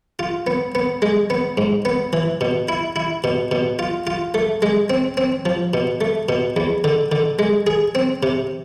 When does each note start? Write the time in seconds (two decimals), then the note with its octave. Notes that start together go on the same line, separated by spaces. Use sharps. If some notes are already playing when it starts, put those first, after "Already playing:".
0.19 F4
0.47 B3
0.75 B3
1.02 G#3
1.30 B3
1.58 G#2
1.85 B3
2.13 E3
2.41 B2
2.69 E4
2.96 E4
3.24 B2
3.51 B2
3.79 F4
4.07 F4
4.34 A3
4.62 G#3
4.90 C4
5.17 C4
5.46 F3
5.74 B2
6.01 A3
6.29 B2
6.57 E2
6.84 D3
7.12 D3
7.39 G#3
7.67 G#4
7.95 C4
8.23 C3